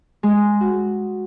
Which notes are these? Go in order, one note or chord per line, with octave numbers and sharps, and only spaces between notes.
G#3
F#4